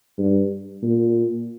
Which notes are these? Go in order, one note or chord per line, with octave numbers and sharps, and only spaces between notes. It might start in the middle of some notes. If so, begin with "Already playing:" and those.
G2
A#2